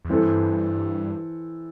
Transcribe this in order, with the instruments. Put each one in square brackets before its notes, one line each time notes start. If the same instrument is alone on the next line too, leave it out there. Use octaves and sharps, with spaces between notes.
[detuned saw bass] E2
[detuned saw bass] G2 [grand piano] E3 C4 A4